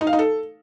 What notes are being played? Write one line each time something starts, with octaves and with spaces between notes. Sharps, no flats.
D#4
F5
D#4
A4